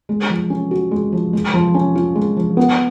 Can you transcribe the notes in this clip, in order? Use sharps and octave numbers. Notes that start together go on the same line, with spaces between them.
G#3
F3
C#4
F#4
G#3
F3
G#3
F3
C#4
F4
G#3
F3
B3